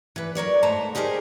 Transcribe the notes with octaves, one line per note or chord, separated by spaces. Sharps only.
E3 B4
F#3 A#4 C#5 D5
D#2 G#2 A3 C5 A#5
D#4 G4 G#4 A#4 C5